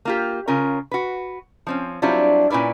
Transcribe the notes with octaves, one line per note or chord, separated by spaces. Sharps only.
A#3 F4 G4
C#3 C#4 F4 A#4
F#4 B4
F3 C4 C#4
F#3 G3 C4 D4 E4 F4
A#2 C#4 E4 B4 D5